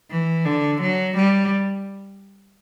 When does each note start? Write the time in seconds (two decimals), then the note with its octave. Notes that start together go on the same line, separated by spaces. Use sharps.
0.10 E3
0.45 D3
0.81 F#3
1.16 G3